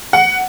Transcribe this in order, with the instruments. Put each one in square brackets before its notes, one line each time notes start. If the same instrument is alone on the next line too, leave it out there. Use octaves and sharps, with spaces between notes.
[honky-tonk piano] F#5